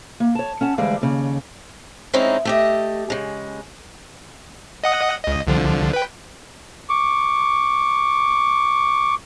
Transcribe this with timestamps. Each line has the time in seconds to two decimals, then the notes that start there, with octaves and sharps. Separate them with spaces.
0.20 A#3
0.35 C#5 A5
0.61 C#4 F#5 A5
0.78 D2 E3 G3 G#3 D5 F5
1.01 D#2 C#3
2.14 G#3 C4 C#4 D#4 E4
2.45 A3 G4 D#5
3.10 C#3 G#3
4.84 D#5 F#5 D#6
5.23 C#2 D#5
5.47 C2 D3 F3
5.93 B4 G5
6.89 C#6 D6